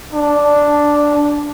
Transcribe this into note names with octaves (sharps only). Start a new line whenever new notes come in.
D4